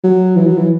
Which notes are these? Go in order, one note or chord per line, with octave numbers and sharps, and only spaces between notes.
F#3
E3
F#3
E3